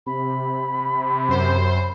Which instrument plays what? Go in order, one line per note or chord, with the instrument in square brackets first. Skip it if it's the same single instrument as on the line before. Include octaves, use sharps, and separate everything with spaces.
[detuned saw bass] C3 [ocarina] B5
[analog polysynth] F#2 C5